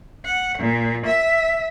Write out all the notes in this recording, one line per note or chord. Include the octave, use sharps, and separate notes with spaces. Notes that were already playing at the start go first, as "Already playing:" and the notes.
F#5
A#2
E5